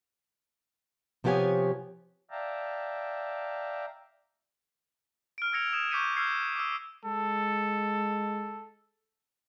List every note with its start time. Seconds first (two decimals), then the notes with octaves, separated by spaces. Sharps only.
1.24 C3 F3 B3 G4 C#5 G#5
2.31 D5 E5 F5 G5 A5 A#5
5.38 F6 D7
5.53 E6 G#6 A#6 C#7 F7
5.73 D#6 G#6 C#7 E7
5.91 C#6 D6 G6 B6 C#7 D#7
6.16 E6 F6 G6 G#6 C7 C#7
6.56 D6 E6
7.05 G#3 A4